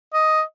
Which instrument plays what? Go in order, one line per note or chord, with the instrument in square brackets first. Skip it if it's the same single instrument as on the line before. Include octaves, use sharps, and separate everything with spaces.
[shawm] D#5